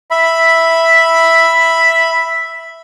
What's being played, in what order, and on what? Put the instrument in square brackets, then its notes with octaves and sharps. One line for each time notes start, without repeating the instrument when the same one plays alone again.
[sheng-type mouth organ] E5 B5